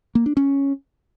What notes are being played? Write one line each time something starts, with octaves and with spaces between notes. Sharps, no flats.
A#3
D4
C#4